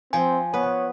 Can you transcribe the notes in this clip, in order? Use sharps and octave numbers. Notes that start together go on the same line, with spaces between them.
F3 C4 G5 G#5
B3 B4 C#5 F#5 D#6